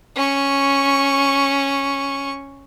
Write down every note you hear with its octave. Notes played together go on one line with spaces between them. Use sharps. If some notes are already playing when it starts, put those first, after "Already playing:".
C#4 C#6